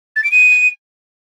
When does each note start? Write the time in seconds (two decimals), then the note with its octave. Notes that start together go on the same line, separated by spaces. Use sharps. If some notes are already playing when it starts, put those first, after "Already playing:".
0.16 A6
0.24 D7
0.31 D#7